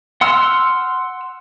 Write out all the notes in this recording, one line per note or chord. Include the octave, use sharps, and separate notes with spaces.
F#5 C6 E6 F6